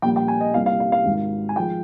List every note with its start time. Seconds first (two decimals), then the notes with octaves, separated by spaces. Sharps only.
0.02 A#1 A#2 G3 A#3 G5
0.16 G5
0.28 G#5
0.41 D#5
0.54 C2 C3 G3 A#3 F5
0.66 F5
0.80 F5
0.92 F5
1.05 G#1 G#2 D#3
1.49 G#5
1.56 F3 G#3 G5